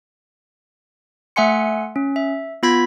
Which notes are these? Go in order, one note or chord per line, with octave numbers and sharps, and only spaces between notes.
A3 E5 F#5 G#5 C6 C#7
C#4
E5
B3 F4 B5 G#6 B6